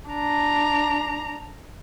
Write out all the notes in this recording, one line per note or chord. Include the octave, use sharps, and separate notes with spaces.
D4 A#5